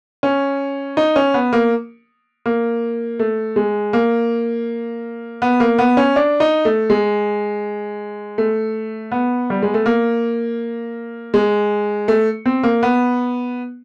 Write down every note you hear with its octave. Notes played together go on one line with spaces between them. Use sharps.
C#4
D#4
C#4
B3
A#3
A#3
A3
G#3
A#3
B3
A#3
B3
C#4
D4
D#4
A3
G#3
A3
B3
G3
G#3
A3
A#3
G#3
A3
C4
A#3
B3